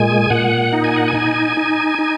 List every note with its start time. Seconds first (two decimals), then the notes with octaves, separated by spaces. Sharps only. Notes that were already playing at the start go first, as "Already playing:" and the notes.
Already playing: A#2 G#3 G#5
0.30 A#2 F#5
0.73 D#4
0.84 G#5
0.96 F#5
1.08 G#5
1.14 D#4
1.57 D#4
1.99 D#4